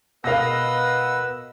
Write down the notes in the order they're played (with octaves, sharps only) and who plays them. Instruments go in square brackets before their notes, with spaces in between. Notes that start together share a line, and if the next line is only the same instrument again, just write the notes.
[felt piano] B2 A#4 [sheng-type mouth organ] B4 F#5 E6 [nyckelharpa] D#5 [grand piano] F5 A#6